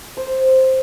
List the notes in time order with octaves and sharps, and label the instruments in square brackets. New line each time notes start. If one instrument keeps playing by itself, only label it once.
[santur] C5